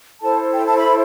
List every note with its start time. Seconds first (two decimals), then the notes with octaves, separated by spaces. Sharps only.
0.20 E4 A4 C5 A5
0.53 G5
0.66 A5
0.76 B5